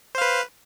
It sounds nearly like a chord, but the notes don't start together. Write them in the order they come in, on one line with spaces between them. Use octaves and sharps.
C5 F5 B4